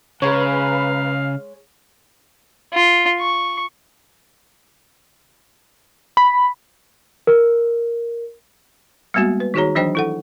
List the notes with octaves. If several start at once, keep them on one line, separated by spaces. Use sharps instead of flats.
C#3 G#3 B4 C#5 D#5 F5 A#5
F4
C#6
B5
A#4
G3 G#3 A#3 B3 F#4
B4
D#3 D#4 F#4 G#4 C#5 A#5
E3 F#3 D4 C5 D#5 G5
E4 A4 F#5